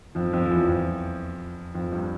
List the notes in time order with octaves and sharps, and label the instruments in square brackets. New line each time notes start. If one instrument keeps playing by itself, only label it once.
[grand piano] F2 F3
F2 F3
F3
E2 E3
F2 F3
F2 F3
G2 G3